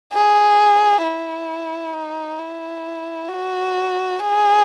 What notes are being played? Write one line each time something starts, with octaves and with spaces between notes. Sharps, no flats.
G#4
E4
D#4
E4
F#4
G#4